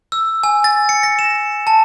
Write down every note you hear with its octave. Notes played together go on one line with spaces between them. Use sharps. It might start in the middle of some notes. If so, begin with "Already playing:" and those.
E6
G#5
A6
C#7
A#6
E7
A5